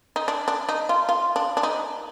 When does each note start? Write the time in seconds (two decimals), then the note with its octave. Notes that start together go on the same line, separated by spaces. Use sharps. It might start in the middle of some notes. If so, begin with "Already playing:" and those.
0.16 D#4
0.28 D4
0.48 D4
0.69 D#4
0.89 F4
1.09 F4
1.36 D4
1.57 D4
1.63 D#4